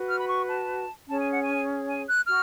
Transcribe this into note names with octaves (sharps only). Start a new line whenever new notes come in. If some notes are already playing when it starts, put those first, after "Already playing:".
Already playing: F#4 B4
F6
B5
C#6
A5
C#4 G#4 C#5 A5
G#5
F#5
G#5
G#5
F#6
F#4 F6